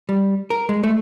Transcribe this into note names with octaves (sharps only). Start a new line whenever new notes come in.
G3
A#4
G#3
A3